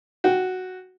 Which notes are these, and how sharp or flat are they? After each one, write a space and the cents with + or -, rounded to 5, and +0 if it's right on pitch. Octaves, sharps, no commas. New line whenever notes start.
F#4 +0 G5 +0